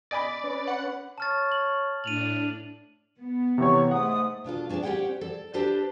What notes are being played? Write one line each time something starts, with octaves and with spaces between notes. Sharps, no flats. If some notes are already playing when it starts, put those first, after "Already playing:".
D5 D#5 G#5 B5
C#4 B4
F#5
C#5 A5 F6 A6
F#7
A2 D4 D#7 F7 F#7
B3
C3 E3 F#4 C#5 A#5 C#6
G#2 A3 F#5 D#6
B2 D4 F4 A4
C#4 D4 G#4 B4 D5
C#4 G4 C5 C#5 F#5 G5
A4 D5
D4 G4 A4 B4 C5 D5